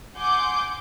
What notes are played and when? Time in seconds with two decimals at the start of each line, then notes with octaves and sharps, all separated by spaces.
0.17 F#5 G#5 C6 D6 G6